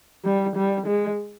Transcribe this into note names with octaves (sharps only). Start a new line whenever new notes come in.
G3
G3
G#3